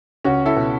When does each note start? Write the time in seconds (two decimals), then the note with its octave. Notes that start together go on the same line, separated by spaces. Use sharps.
0.24 C#2 C#4 F#4
0.46 E4 A4
0.56 B2